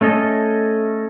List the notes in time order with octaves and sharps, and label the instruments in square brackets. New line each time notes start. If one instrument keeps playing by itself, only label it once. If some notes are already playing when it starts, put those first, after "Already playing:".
[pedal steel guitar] A3 C#4 A4 D#5